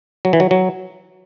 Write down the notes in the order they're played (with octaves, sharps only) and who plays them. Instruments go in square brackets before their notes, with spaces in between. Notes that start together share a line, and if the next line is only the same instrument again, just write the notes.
[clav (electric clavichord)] F#3
E3
F#3
F#3